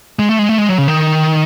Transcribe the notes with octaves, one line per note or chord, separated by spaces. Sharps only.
G#3
A3
G#3
A3
G#3
F#3
C#3
D#3